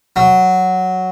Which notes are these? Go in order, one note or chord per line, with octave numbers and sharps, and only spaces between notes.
F#3